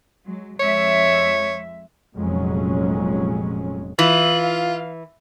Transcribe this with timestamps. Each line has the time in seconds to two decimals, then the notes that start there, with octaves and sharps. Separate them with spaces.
0.24 F#3 G#3
0.59 F2 G#3 C#5 E5
2.16 F1 F2 A#2 F#3 G#3 C#4
3.99 E3 F4 F#7
4.43 F5